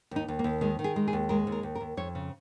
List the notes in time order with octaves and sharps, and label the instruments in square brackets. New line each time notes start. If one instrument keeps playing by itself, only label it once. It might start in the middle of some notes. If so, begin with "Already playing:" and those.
[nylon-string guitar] D#2 D#4
D#2
A#3
D#2
D#3 G#3
D#3
G#4
G#3
G#4
D#2
G#3 A#4
D#2
A#4
D#2
A#4
D#2
F2 C#5
C#3